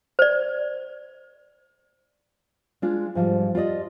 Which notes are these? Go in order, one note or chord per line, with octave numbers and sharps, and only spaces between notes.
C5 D5
G#3 D4 F4
G#2 F3 G3
F4 G4 D5 D#5